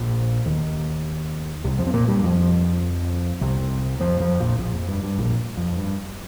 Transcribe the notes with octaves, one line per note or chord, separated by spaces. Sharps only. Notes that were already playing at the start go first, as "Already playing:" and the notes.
Already playing: A#1 A#2
D#2 D#3
C2 C3
F2 F3
C4
A#2 A#3
G2 G3
F2 F3
C2 C3
F2 F3
F2 F3
A#1 A#2
A#1 A#2
F2
G2
G2
A#1 A#2
F2
G2